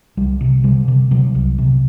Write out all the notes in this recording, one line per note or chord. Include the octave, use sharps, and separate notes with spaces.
C2 G3
C3
C3 G3
C3
C3 F#3
C2
C3